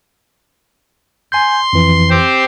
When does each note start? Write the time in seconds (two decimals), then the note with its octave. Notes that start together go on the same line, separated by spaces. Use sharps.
1.32 G#5 C6 G6
1.73 F2 E3
2.10 C4 G4 C5